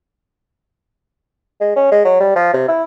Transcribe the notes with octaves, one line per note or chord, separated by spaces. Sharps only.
G#3
C#4
G#3
F#3
G3
F3
C3
E4